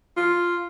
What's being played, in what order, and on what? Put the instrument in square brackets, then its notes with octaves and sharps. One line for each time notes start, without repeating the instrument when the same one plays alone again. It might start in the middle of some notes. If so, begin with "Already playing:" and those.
[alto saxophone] F4